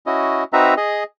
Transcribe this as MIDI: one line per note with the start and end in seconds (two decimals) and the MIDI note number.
0.06 0.44 61
0.06 0.44 64
0.06 0.44 66
0.06 0.44 75
0.53 0.74 60
0.53 0.74 63
0.53 0.74 66
0.53 0.74 71
0.53 0.74 76
0.53 0.74 82
0.77 1.04 68
0.77 1.04 75